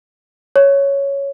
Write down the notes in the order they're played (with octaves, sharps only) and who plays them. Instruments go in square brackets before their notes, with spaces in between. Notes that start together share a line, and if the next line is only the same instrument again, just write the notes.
[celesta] C#5